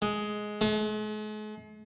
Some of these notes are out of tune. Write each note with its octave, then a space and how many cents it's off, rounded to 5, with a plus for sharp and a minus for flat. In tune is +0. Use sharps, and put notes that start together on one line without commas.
G#3 +10
G#3 +45